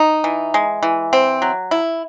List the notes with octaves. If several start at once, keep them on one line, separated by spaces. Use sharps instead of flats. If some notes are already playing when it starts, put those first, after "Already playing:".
Already playing: D#4
E3
G#3
E3
C4
F#3
E4